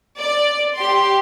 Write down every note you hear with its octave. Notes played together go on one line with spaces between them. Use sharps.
D5
G4 C6